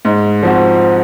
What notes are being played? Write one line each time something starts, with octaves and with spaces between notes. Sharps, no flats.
G#2
F3 C4 F#4